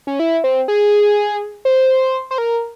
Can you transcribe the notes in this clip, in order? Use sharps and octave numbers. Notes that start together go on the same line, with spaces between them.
C#4
E4
C4
G#4
C5
C5
A#4